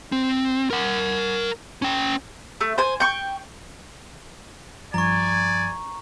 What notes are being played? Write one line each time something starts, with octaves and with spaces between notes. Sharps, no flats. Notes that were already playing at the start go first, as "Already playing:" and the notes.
C4
A#4 F#5
C#4 G5
A3
C5 G#5
G5 C#6
G2 F3 D5 G#5 A#5 C#6